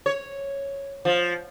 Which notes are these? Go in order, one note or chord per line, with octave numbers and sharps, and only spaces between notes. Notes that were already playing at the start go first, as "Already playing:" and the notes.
C#5
F3